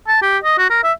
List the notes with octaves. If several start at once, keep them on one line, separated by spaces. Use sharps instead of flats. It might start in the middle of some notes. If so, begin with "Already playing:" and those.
A5
G4
D#5
F#4
A#4
E5